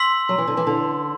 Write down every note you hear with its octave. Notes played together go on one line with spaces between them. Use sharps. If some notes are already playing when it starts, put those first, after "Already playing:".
Already playing: C6 E6 B6 F#7
F#3
E3
D3
E3
D3